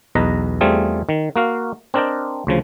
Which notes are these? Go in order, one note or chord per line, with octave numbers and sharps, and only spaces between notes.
B1 E2 B4 D#5 A#5
E2 G3 A3 C4 F4 G#4
D#3
A#3 F#4 F5
C4 D4 A#4 D5 D#5 G5
D2 C#3 F3